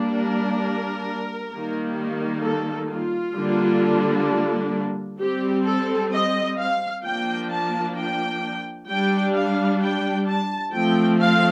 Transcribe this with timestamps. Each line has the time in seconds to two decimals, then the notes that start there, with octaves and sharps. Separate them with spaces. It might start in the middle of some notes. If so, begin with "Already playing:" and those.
Already playing: G3 A#3 D4
0.12 A#4
1.50 D#3 G3 A#3
2.42 A4
2.89 F4
3.35 D3 G3 A#3 D4
5.20 G3 C4 G4
5.65 A4
6.12 D#5
6.58 F5
7.04 F3 A#3 D4 G5
7.50 A5
7.96 G5
8.89 G3 D4 G5
9.35 F5
9.81 G5
10.28 A5
10.73 F3 A3 C4 G5
11.20 F5